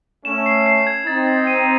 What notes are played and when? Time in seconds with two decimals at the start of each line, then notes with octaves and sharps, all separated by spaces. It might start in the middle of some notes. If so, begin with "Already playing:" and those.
0.25 A3 C#4 E7
0.46 C7
0.66 C7
0.87 G#6
1.06 C4 D#4 A6
1.27 A6
1.47 D#7